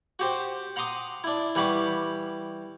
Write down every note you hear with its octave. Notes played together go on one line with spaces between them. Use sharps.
F#4 G4 C5
F#5 A#5 C6 D6 D#6
D4 E4
E3 G3 F#5 B5 C#6 D6